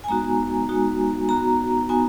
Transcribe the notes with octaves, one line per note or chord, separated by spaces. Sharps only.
G#5
G#3 B3 D#4 F#4 A#5
G#3 B3 D#4 F#4
B3 D#4 F#4 A#5
B3 D#4 F#4 G#5